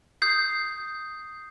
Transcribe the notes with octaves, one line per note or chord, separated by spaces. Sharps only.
D#6 G6 C7